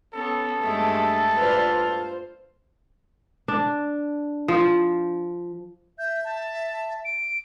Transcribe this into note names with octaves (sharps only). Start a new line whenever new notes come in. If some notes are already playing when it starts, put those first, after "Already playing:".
B3 C#4 A4
G2 G#3 A3
F4 B4 C5 D5
C5
D4
F3
E5 G6
A5
D7